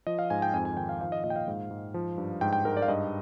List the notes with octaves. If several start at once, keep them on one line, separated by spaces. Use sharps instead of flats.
F3 D#5
F5
G#2 G#5
G5
F2 G#5
G#5
D#3 G5
F5
F3 F5
D#5
A#2 D#5
G5
F5
G#2
G#2
F3
G2
G#2 G5
G5
G#2 A#4
D5
F5
G2 D#5